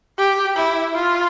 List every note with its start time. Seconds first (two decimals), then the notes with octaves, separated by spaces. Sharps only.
0.19 G4
0.57 E4
0.95 F4